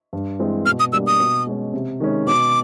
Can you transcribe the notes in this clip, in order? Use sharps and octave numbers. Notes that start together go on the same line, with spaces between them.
G2
E3 G#3 C4
B2 F6
D#6
G3 A#3 D4 E6
D#6
B2
G#3 C#4
C3
D#3 G#3 C#4
B2 D6